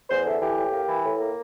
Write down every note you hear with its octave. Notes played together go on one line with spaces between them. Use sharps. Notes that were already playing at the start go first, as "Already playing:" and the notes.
E2 C5
D3 E5
E3 G4
A2
A#3
E3
A2
A#3